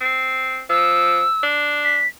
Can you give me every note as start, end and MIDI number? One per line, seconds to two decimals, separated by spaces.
0.01 0.61 60
0.70 1.23 53
0.70 1.43 88
1.43 2.03 62
1.84 2.07 95